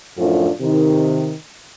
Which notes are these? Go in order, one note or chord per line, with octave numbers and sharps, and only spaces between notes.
F#2 A2 F3 A3 D4 F4
C3 D#3